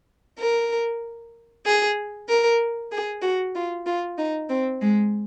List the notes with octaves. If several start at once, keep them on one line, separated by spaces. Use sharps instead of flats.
A#4
G#4
A#4
G#4
F#4
F4
F4
D#4
C4
G#3